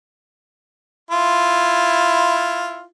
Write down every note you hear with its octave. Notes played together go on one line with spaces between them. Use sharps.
E4 F4